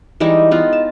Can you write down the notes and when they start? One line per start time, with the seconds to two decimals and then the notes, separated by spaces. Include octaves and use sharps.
0.20 E3 G3 G#3 D#4
0.51 B3 D#4 F4
0.73 A5